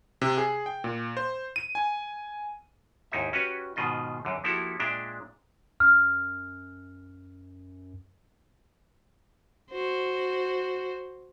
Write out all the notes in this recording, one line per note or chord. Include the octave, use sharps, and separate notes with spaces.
C3
G#4
G5
A#2
C5
D#7
G#5
D#2 G#2 D#4 E4 E5
C#4 F#4 G4 B4
G#2 B2 D#3 F4 D#5
F#2 D3
F3 A#3 E4 F#4 G4 A4
A#2 G#3 D4 E5 G5 A#5
F#2 F6
F#4 C5